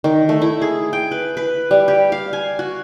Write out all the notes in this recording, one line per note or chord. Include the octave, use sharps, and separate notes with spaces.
D#3
A3
E4
G#4
G5
B4
B4
G3
G4
F5
G#5
F#4